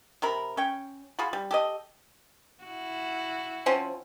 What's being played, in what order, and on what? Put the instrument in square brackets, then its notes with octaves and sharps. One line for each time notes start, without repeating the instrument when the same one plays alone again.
[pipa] C3 A#4 B5
C#4 C#5 G5
F4 F#4 G#4 B5
G3
G4 A4 D#5
[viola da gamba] E4 F#4
[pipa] F3 C4 C#4